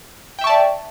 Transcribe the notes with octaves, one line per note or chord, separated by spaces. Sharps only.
D5 E5 G5 A5 C#6